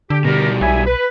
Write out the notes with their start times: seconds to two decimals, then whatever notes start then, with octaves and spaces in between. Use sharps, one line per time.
0.10 D3 G4
0.25 B2 G3 G4 A#4
0.61 B1 E4 E5 G#5
0.87 B4